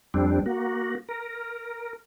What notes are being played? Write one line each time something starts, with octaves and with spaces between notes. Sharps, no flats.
F2 G3 C4 D4
A#3 F#4
A#4